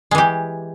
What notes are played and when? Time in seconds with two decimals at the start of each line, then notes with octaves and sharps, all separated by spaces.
0.11 G#3
0.15 E3
0.18 G4